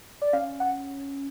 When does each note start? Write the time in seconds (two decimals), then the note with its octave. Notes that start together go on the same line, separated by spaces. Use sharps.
0.22 D5
0.33 C#4 F5
0.60 F#5